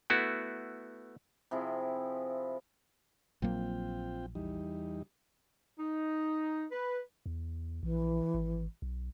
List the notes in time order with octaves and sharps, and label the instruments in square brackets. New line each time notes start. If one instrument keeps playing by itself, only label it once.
[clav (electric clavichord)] A3 B3 E4 F#4
[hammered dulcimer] C3 F3 E4 G#4
[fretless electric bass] A#1 F#3 A#3 [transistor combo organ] C4 F4 G5
[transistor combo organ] E2 G3 D#4
[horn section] D#4
B4
[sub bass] E2
[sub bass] A#1 [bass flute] E3
[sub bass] G#1
B1